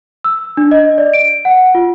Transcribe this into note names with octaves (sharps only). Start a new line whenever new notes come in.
E6
D4
D#5
D5
D7
F#5
F4